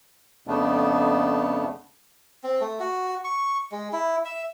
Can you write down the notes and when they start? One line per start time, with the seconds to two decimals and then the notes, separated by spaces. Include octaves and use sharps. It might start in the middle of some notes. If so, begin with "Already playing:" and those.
0.47 F2 C#3 A3 B3 D4
2.44 C4
2.61 A3
2.80 F#4
3.24 C#6
3.72 G#3
3.93 E4
4.25 E5